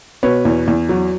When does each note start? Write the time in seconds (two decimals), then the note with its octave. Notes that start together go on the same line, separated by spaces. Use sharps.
0.23 B2 B4 C#5
0.45 E2
0.68 E2
0.89 F#3